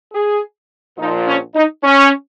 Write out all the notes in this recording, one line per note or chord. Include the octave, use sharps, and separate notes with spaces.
G#4
A#1 A#2 F3 D#4
C#4
D#4
C#4